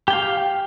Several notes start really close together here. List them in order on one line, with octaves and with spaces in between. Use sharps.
G4 G5 F5